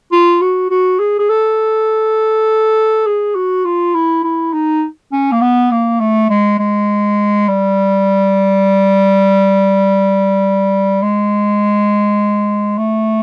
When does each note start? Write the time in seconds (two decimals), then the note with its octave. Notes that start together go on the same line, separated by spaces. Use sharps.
0.12 F4
0.41 F#4
0.70 F#4
0.99 G#4
1.19 G#4
1.30 A4
3.06 G#4
3.35 F#4
3.65 F4
3.95 E4
4.24 E4
4.53 D#4
5.13 C#4
5.32 A#3
5.41 B3
5.71 A#3
6.00 A3
6.30 G#3
6.59 G#3
7.48 G3
11.02 G#3
12.78 A3